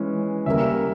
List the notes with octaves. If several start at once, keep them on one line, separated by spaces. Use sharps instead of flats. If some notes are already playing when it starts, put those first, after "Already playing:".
Already playing: E3 G#3 C#4
C#3 G3 A#3 E5